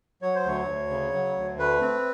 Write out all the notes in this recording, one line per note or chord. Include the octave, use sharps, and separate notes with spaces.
F#3 C#5
C5
D2 C#5
D2
C#3
F#3
D2
A3 B4
C4